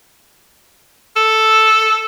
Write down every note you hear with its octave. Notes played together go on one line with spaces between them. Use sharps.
A4